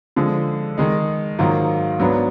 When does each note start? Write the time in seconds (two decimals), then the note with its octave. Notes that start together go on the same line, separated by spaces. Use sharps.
0.16 D3 F3 G#3
0.78 D#3 G#3 D#4
1.39 G#2 D#3 F#3 A#3 F4
2.00 G#2 F#3 B3 D4